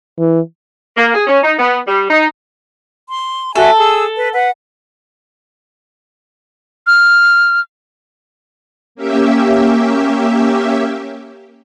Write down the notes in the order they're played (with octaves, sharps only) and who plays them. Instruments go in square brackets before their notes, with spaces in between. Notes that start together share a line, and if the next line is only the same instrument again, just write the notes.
[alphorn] E3
[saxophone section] A#3
G#4
C#4
D#4
B3
G3
D#4
[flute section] C6
[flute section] F#4 E5 G#5 [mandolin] A4
[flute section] G#4 E6
B4
B4 F#5
[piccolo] F6
[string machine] A#3 C#4 G4 E5